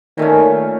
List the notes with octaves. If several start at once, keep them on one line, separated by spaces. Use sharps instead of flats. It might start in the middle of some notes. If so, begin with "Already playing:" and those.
A#2 D#3 A3 C#4